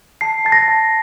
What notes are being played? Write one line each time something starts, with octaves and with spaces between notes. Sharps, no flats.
A5 C7
A5 A6
A#6
A5